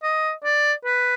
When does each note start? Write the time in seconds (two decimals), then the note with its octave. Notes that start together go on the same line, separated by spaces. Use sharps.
0.03 D#5
0.44 D5
0.85 B4